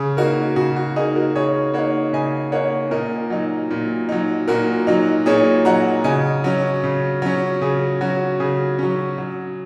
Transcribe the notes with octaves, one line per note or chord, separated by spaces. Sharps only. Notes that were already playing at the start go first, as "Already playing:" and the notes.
Already playing: C#3 G#4
A#3 D#4 F#4 A#4
C#3 F#4
F#4
A#3 D#4 G#4
F#4 A#4
C#3 G#4 C#5
A#3 D#4 C#5 F#5
C#3 D#5 G#5
A#3 D#4 C#5 F#5
A#2 A#4 D#5
F#3 D#4
A#2
F#3 D#4
A#2 F#4 A#4
F#3 D#4
A#2 G#4 C#5
F#3 D#4 F#5 A#5
C#3 D#5 G#5
F#3 C#4
C#3
F#3 C#4
C#3 G#4
F#3 C#4 F#4
C#3 G#4
F#3 C#4
F#3